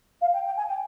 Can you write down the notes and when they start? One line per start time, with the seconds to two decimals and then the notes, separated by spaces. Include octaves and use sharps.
0.21 F5
0.33 G5
0.45 G5
0.57 G#5
0.68 G5